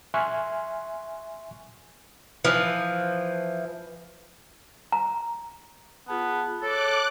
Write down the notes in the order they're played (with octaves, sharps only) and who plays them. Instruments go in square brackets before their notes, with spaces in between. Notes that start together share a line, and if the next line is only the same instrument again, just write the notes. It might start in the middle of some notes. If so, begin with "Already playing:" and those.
[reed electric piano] E5 G#5 C6 C#6 F6 F#6
[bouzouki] E3 F3
[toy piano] A#5
[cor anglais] B3 [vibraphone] F4 G#4 A5
[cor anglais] A4 [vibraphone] C#5 [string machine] D6 F#6